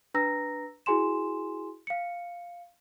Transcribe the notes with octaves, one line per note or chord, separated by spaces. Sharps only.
D4 B4 A#5 E6 A#6
E4 F#4 G#4 G#5 C6 E7
F5 C#7